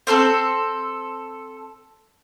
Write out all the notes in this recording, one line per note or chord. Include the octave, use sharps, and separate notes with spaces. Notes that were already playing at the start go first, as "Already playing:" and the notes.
C4 A4 A#4 C5